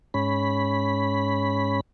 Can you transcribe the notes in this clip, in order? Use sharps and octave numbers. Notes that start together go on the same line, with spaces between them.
G#2 C#4 B5